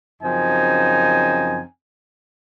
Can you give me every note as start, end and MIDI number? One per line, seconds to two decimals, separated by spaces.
0.22 1.61 42
0.22 1.61 49
0.22 1.61 53
0.22 1.61 60
0.22 1.61 63
0.22 1.61 80